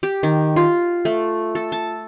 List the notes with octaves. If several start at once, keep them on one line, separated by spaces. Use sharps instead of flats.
G4
D#3
F4
A3
A4
A5